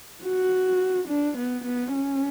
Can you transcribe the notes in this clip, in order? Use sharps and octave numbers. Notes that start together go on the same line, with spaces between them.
F#4
D4
B3
B3
C#4